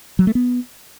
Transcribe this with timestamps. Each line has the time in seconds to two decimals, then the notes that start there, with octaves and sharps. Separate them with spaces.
0.19 F#3
0.27 A3
0.35 B3